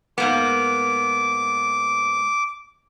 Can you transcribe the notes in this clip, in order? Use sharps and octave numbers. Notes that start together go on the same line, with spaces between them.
G#2 A#3 B3 D6